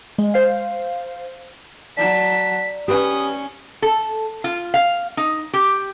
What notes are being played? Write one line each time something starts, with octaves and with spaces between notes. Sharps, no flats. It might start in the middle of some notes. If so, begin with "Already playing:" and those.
G#3
C5 F5
F#3 D5 A5 A#5 B6 E7
C#4 G4 B4 D#6
A4
F4
F5
D#4
G4